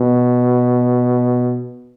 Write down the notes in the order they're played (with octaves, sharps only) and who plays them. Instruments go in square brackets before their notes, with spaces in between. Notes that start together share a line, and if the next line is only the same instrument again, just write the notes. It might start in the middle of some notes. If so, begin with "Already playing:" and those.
Already playing: [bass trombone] B2